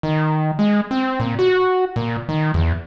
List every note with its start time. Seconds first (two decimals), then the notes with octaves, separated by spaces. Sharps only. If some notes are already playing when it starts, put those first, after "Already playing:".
0.03 D#3
0.59 G#3
0.91 C4
1.20 A#2
1.39 F#4
1.96 A#2
2.29 D#3
2.54 E2